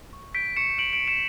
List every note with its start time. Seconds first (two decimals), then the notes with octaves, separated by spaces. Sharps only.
0.13 C#6
0.35 G6 B6 D7
0.56 C#6 C#7 E7
0.78 G6 D7 F#7
0.93 D7 F#7
1.01 C#6
1.08 C#7 E7